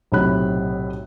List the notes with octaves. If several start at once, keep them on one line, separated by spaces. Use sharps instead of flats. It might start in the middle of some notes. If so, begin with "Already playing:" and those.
B1 A2 C3 C#5 B5 F#6